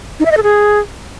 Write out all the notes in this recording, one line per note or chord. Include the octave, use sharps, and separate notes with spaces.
D#4
E5
D#5
A4
G#4